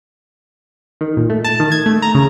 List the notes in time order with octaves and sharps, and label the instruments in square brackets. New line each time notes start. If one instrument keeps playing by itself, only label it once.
[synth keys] D#3
A#2
A3
A5
D#3
G#6
A3
A#5
C#3